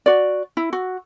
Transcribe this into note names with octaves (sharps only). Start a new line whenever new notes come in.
F#4 D5
E4
F#4